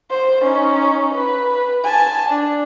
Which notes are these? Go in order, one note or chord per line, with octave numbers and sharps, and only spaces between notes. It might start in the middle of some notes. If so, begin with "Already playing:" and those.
C5
C#4 D#4
B4
B4
G#5 A5
D4